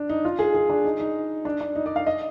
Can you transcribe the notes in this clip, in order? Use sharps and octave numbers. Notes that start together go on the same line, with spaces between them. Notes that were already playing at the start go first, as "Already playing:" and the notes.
Already playing: D4
D#4
F4
G#4
G#4
D4
D#4
D#4
D4
D4
D#4
D5
F5
D#5